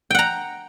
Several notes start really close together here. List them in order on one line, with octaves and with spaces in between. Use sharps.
G5 F#5 A#5